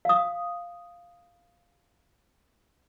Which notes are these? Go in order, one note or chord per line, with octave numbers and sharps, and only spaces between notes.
F5 D#6